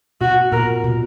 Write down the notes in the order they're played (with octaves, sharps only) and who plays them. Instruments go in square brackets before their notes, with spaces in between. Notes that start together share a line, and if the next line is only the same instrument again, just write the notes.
[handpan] B2 [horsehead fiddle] F#4
[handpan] A#2 [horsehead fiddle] A#4
[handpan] B2